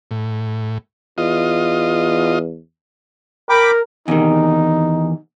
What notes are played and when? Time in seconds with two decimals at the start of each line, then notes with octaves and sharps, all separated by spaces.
0.11 A2
1.18 E2 F4 D#5
3.49 A#4 G5 B5 D6
4.08 E2 C3 D#3 D#4